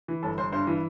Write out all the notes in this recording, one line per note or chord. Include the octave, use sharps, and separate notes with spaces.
E3
G1 A4
G1 C5
G2 C5
E3